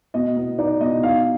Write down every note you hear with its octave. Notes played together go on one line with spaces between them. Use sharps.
B2 D#5
B3
D#4 D5
B2 D#5
D#4 F5